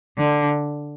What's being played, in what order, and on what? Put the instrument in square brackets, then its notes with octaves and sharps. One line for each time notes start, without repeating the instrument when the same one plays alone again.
[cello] D3